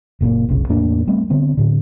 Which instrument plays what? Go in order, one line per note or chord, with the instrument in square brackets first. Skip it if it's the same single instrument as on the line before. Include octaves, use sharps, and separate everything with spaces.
[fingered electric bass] F#1 A#2 C#3 A#3
F1 B1 C#3
E2 A2 A#3 D4
G3 A3 B3 C4
D3 B3 C4
A2 D3